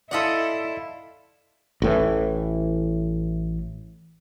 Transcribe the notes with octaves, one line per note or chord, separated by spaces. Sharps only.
E4 A4 D5 D#5 F5 F#5 C6
A1 A2 E3